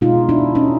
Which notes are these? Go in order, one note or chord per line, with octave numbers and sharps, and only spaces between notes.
B2 G#3 D#4 F4
D4 E4
C#4 D#4